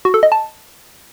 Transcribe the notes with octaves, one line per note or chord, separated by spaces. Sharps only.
F#4
A4
D#5
A5